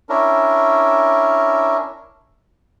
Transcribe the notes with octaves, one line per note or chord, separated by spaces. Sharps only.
C#4 D4 E4 A#4